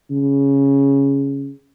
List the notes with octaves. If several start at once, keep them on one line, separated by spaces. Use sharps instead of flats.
C#3